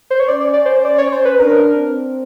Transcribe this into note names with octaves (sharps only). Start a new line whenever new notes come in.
C5
C#5
C#4 D5
D5
D5
C5
D5
C#4 C#5
C5
B4
D4 A#4
C4